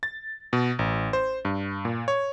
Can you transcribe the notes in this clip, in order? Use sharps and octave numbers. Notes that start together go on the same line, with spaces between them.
A6
B2
A1
C5
G2
A#2
C#5